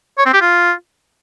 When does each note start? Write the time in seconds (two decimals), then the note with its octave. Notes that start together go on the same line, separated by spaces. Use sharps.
0.18 C#5
0.26 C4
0.33 G4
0.41 F4